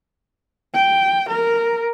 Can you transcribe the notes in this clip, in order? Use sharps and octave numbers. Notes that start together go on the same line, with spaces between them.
G5
A#4